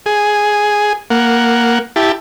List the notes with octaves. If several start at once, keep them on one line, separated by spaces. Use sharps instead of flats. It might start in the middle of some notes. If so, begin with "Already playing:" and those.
G#4
A#3 F#5
E4 G4 A5